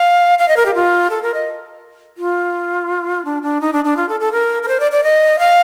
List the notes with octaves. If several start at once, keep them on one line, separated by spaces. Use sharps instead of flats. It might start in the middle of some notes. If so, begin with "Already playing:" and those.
Already playing: F5
F5
D#5
A#4
G4
F4
A4
A#4
D#5
F4
D4
D4
D#4
D4
D4
F4
A4
A4
A#4
A#4
C5
D5
D5
D#5
F5